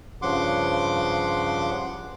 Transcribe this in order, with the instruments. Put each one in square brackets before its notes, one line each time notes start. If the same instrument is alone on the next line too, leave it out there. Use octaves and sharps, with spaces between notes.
[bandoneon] G2 C#3 F3 F#5 C6 D6